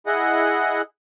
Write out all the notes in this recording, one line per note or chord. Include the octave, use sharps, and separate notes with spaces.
E4 G#4 D#5 F#5